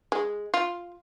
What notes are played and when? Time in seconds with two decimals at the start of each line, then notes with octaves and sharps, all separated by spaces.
0.12 G#3
0.54 F4